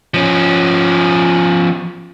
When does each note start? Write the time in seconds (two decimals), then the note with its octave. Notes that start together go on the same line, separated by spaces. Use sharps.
0.14 F3 C#4